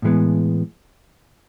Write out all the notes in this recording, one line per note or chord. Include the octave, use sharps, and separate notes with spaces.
A2 E3 G#3 B3